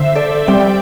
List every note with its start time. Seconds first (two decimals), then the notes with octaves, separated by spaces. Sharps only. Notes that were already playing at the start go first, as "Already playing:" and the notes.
Already playing: D3 C5 E5
0.15 A4 D5
0.47 G3 C4 D5 G5